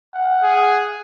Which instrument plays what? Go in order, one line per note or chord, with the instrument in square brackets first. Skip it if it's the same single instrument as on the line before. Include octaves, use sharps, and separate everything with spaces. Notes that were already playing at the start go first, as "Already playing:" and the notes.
[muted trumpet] F#5
[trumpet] G#4